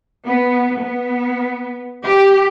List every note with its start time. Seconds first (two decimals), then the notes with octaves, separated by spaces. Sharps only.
0.25 B3
0.79 B3
2.03 G4